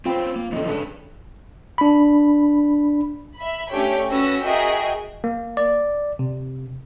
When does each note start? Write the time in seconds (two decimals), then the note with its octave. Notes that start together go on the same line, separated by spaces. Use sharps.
0.05 C4 C#4 F4 B4 C5 G5
0.36 A#3
0.52 D3 E3 F3 C#4 D#4
0.68 C#3 G#3 C#4 D4 A4 B4
1.78 D4 B5
3.36 E5 B5
3.69 A3 C#4 D4 G4 C#5 G5
4.11 C#4 F#4 B4 E6 A#6
4.44 F#4 G#4 A#4 D#5 E5 G5
5.24 A#3
5.57 D5
6.19 C3